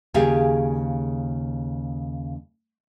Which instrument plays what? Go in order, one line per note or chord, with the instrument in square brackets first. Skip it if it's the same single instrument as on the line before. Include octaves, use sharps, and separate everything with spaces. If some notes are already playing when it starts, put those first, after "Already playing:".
[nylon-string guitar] D#2 C#3 G4 G#4 F5